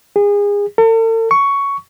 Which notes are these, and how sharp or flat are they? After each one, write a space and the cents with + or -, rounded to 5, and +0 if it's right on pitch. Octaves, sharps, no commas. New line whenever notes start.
G#4 -30
A4 +45
C#6 +10